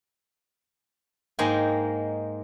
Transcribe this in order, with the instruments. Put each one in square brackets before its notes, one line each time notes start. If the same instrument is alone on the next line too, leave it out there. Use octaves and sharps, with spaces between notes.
[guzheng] G#2 G#3 A#3 D#4 G5 G#5